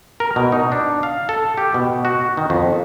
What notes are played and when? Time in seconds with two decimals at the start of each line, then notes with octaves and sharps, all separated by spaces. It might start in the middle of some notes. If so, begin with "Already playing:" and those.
0.20 A#4
0.36 B2
0.52 D#4
0.72 D4
1.03 F5
1.29 A4
1.58 G4
1.74 B2
2.05 F#4
2.37 D#3
2.50 F2